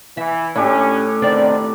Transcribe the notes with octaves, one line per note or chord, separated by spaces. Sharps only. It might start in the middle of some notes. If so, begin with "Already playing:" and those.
E3 E5
A2 C#4 D4 G4 C#5
E2 D3 D#3 C4 D5